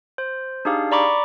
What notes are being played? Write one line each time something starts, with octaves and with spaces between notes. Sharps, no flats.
C5
D4 D#4 G4 G#4 F5
D5 A#5 B5 C#6 D6